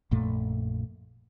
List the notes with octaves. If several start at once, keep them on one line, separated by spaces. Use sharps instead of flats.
A#1 F#2 A#2 A3